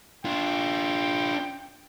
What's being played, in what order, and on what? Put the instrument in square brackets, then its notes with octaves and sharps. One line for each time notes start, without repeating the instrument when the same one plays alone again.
[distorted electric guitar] D4 F4 [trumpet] G5